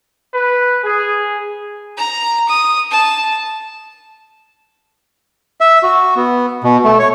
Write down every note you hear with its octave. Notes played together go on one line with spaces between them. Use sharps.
B4
G#4
A#5
D#6
A5
E5
F#4
B3
B2
A3
C#5